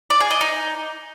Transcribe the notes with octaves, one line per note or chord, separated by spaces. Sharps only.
D5
G#4
D#5
D#4